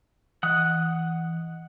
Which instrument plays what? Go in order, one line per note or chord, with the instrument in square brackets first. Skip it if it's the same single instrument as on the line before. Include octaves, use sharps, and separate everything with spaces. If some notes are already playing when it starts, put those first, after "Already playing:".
[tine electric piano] E3 D#5 [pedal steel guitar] F#5 D#6 F#6